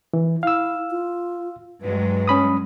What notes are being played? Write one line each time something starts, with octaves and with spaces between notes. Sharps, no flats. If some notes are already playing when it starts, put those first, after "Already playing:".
E3
E4 F5 E6
F4
G2 F#3 G#3 B4
C#4 B5 D#6